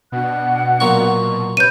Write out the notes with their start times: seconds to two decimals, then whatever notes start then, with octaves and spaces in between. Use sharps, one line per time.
0.12 B2 D4 F#5 F#6
0.80 A#2 F#3 C#6
1.57 C3 B4 C#5 G6 D#7